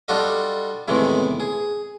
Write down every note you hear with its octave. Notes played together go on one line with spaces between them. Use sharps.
G3 D4 F4 F#4 A4 D#5
E2 A2 C3 D#3 E3 G#3
G#4